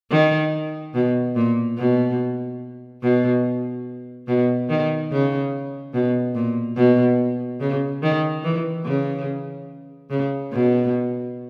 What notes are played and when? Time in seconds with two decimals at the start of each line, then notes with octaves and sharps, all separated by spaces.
0.11 D#3
0.94 B2
1.36 A#2
1.78 B2
3.02 B2
4.27 B2
4.70 D#3
5.11 C#3
5.94 B2
6.35 A#2
6.77 B2
7.60 C#3
8.03 D#3
8.44 E3
8.85 C#3
10.10 C#3
10.52 B2